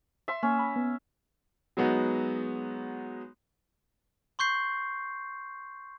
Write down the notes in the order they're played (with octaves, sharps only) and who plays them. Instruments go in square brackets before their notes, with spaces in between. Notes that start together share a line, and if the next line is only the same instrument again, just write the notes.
[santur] E5 C6
[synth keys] A#3 [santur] C#4
[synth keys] B5
B3
[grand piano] F#3 G#3 B3 D#4 F#4
[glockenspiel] C6 C#6 G6 C7